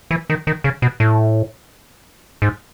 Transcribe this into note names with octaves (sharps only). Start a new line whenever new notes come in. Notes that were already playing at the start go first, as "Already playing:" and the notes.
E3
D#3
D#3
C#3
B2
A2
G#2